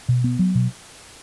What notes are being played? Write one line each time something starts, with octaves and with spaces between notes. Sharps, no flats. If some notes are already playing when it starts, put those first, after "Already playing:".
B2
B3
F#3
B2